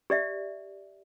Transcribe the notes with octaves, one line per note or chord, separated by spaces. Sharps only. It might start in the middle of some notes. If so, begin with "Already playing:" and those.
G4 D5 E5